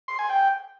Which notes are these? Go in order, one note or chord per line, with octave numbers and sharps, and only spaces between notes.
C6
G#5
G5